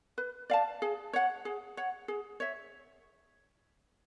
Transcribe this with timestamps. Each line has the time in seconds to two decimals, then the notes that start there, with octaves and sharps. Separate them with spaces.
0.18 B4
0.50 D5 F5 A5
0.82 G#4
1.13 C#5 F#5
1.45 G#4
1.77 C#5 F#5
2.08 G#4
2.40 C#5 E5